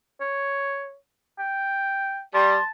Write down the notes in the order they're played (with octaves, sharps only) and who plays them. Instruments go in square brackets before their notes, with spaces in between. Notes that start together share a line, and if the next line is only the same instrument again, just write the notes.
[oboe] C#5
G5
[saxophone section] G3 [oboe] A5 [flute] C6